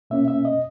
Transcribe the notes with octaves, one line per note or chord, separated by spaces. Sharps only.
B2 A#3 C#4 E5
E5
D#5